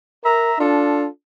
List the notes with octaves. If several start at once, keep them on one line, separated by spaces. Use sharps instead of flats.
A#4 E5 A#5
D4 F4 A4